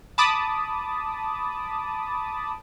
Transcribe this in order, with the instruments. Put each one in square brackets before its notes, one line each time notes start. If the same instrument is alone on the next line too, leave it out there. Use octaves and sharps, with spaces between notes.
[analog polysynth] A5 B5 D6 D#6